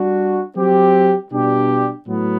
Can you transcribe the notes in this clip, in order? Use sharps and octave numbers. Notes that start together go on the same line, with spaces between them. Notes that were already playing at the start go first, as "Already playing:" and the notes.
Already playing: G3 D4 F#4
F#3 C4 G4
B2 G3 D4 G4
A2 F#3 B3